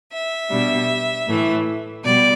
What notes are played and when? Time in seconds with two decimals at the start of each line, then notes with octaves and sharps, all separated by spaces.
0.12 E5
0.50 B2 G3 D4
1.27 A2 E3 A3
2.04 B2 G3 D5